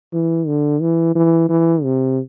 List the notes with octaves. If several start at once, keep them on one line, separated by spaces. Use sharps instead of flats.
E3
D3
E3
E3
E3
C3